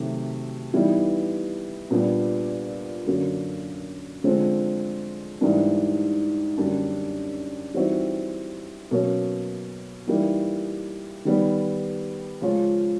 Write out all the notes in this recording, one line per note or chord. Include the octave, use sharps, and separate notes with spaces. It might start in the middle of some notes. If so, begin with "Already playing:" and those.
Already playing: C3 D#3 F#3 A3
E3 G3 B3 D#4
A#2 G3 B3 D4
F#2 D3 F#3 A#3
D3 F3 G#3 C4
G#2 E3 G3 A#3 D4
F#2 D3 G3 A#3 D4
E3 G3 C4 D#4 F#4
B2 F#3 A#3 C#4
E3 G3 A#3 D#4
D#3 G3 B3
C#3 F3 G#3 C#4 F4